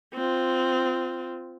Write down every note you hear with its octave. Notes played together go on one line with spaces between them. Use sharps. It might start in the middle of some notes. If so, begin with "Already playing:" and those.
C4 F4